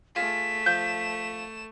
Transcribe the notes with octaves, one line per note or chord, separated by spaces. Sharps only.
A3 F4 G#4 B6 E7
F3 G6